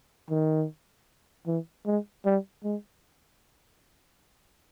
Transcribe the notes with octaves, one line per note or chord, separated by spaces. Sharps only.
D#3
E3
G#3
G3
G#3